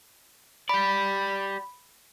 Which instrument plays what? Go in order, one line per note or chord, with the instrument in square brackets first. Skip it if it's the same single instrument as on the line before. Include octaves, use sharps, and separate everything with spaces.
[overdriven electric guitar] G4 D5 [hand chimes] B5